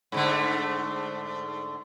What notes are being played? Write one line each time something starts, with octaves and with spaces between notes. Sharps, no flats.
G#2 D3 A3